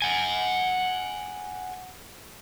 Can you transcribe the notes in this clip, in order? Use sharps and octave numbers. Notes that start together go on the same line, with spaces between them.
F#5 G#5